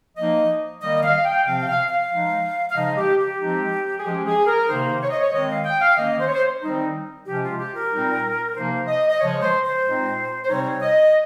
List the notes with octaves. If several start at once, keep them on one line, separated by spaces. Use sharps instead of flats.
F3 A#3 D#4 D#5
D#3 G3 A#3 D#5
F5
G5
C3 F3 C4 F5
G5
F5
F5
F3 G#3 D#4
F5
C#3 F3 G#3 D#4 D#5
G4
G4
F3 G#3 C4 D#4
G#4
F3 G#3 C#4 G4
G#4
A#4
C3 D#3 A#3 D#4 C5
C#5
D#5
C#5
D#3 G#3 C4 D#5
F5
G5
F5
D#3 A#3 C#4 D#5
C5
C#5
C5
D#3 G3 C4 D#4
C3 F3 G#3 C#4 G4
F4
G4
A#4
A#2 G3 C4 D#4
C3 F3 A#3 D#4 C5
D#5
D#5
C#3 F3 G#3 C#5
C5
C5
A#2 G#3 C4 D#4
C5
C3 G3 C4 D#4 C#5
D#5